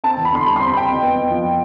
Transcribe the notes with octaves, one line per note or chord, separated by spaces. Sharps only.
C4 A5
E2
B5
D3 C6
G3 B5
C6
C4
B5
C4 G5
F2
B3
F2
F3
F3